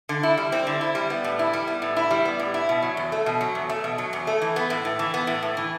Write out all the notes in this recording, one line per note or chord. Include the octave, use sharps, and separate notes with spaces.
D3
E4
G3
C4
D3
E4
G3
B3
A2
E4
G3
B3
A2
E4
G3
B3
A2
E4
B2
F#3
E2
A3
B2
F#3
E2
A3
B2
F#3
E2
A3
E3
B3
A2
A2
E3
B3
A2
A2
E3